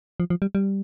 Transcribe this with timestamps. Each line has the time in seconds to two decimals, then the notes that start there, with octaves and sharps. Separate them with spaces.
0.20 F3
0.30 F3
0.42 G3
0.55 G3